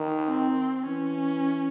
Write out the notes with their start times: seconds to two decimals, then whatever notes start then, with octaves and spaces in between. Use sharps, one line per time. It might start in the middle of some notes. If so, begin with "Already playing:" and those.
Already playing: D#3
0.27 C4
0.86 E3 C#4